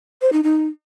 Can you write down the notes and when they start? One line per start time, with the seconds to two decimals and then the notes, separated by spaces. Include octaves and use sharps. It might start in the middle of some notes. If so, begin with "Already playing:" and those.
0.22 C5
0.33 D#4
0.43 D#4